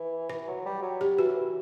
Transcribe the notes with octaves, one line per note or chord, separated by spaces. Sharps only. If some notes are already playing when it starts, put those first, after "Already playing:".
Already playing: E3
E3 B4
F#3
G3
F#3
G4
E3 F#4
E3